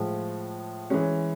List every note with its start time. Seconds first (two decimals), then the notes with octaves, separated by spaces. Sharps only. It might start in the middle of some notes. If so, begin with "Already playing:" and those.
Already playing: A2 F3 G#3
0.90 E3 G#3 C#4